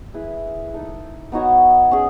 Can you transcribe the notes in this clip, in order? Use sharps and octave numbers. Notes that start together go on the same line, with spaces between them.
E4 G#4 B4
D#4 A4 D#5
B3 D#4 F#4 C#5
C#4 G#4